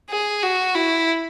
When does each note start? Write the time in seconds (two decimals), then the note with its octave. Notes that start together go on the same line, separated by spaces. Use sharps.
0.10 G#4
0.43 F#4
0.75 E4